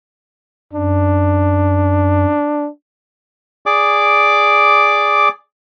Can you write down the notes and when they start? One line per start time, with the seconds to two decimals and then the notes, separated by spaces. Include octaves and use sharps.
0.73 F#2 D4
3.66 G#4 D5 D6